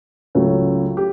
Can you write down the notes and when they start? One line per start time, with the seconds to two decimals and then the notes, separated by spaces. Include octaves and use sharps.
0.35 C#2 C#3 F#3 A3
0.97 G4